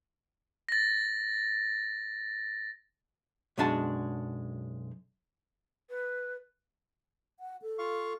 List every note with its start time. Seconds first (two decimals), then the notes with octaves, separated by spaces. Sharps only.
0.69 A6 A#6
3.58 B1 F#2 G#3 D4 F#4 A5
5.90 B4
7.40 F#5
7.62 A4
7.79 F4 F5 C#6